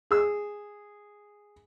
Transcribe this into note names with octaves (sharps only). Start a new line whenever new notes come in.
G#4 E6